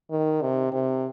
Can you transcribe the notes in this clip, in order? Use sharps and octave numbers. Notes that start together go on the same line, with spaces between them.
D#3
C3
C3